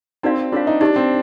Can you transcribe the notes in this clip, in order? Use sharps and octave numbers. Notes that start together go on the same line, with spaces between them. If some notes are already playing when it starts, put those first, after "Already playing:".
C4 D#4 F#4 A#4 D5 F5
D4 F4 A#4 C#5 F5
D#4
D4 D#4 G4 B4
C4